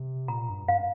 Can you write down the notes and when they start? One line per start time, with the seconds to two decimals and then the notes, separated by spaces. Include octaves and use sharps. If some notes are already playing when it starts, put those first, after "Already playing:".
Already playing: C3
0.28 A#2 A#5
0.49 G2
0.68 G2 F5